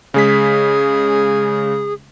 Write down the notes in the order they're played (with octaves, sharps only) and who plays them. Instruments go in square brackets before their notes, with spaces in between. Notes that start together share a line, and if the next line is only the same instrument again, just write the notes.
[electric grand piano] C#3 G#3 B6 [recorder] G#4